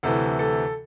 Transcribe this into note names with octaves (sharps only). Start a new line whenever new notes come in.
D2 C3 E3 A4
A4